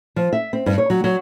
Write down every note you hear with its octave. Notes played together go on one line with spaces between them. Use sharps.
F3
E5
C4
G2
C#5
F#3
F#3